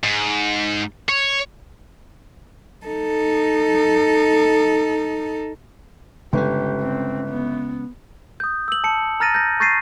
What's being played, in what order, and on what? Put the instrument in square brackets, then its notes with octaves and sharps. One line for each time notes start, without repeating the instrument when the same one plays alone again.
[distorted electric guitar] G#2
C#5
[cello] D#4 A4
[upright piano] G1 [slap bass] C#3 G#3 C#4 [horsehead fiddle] G4
[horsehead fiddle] C4
B3
[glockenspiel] D#6 G6
E6 F#7
A5 C#7
A#5 F6 A6 A#6 D#7
G6 A#6
C#6 G6 A6 A#6 C7 D#7